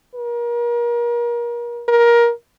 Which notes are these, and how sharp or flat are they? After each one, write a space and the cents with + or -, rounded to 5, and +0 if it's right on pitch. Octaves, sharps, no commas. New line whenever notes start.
A#4 +35
A#4 +20